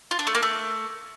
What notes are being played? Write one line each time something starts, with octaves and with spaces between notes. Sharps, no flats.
F4
D4
A3
A#3
A3